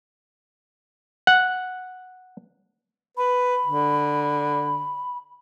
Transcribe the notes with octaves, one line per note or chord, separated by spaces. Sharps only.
F#5
B4 B5
D3